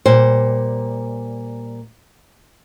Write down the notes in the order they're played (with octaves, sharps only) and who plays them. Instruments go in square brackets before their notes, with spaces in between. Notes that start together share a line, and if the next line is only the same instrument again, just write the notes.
[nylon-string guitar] A#2 G3 C5